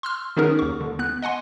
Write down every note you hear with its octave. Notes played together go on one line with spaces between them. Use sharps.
C6 E6 F6
D#3 B3 C#4 D#4 G#4 A#4
D#2 C#6
D3
B3 F#6
D#5 F#5 G#5 C6